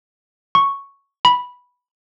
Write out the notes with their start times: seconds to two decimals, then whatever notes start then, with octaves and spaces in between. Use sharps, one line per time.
0.55 C#6
1.25 B5